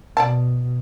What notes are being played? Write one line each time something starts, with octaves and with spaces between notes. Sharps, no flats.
B2 D5 F5 A5